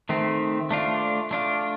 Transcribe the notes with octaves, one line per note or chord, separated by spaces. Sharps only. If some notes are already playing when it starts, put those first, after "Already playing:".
D#3 A3 C4
A3 D4 F4
A3 D4 F4